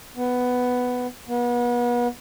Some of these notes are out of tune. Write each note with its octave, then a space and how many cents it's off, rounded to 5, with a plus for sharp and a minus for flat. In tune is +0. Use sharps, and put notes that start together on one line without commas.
B3 +5
B3 -35